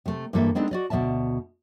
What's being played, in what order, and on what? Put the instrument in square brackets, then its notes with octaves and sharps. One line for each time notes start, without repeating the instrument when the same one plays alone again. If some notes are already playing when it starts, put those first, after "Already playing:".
[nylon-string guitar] C3 A3
G2 E3 A#3 A4 E5
G#3 B3 C4 D4 D#4 A4
F#4 D5 D#5
D2 B2 D#3 D5 E5 A5